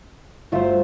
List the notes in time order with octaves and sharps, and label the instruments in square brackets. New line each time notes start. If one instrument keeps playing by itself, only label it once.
[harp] G1 A3 C5 [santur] F#3 F4 E5